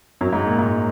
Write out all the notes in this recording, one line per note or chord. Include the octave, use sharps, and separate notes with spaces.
F#2
G#2
A#2
G#2